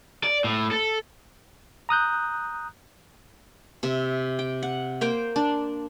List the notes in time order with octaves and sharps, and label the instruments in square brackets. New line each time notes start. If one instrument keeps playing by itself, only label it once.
[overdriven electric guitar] D5
A2
A4
[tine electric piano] A#5 D#6 F#6 G6
[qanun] C3 E5
G5
F#5
A#3 C5 G5
D4